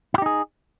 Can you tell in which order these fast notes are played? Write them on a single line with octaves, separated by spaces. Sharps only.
E4 G4 D#4 G#4